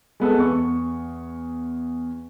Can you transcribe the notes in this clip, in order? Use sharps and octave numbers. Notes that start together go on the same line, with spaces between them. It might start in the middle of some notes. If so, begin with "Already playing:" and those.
G#3 B3 A4
E2 C#6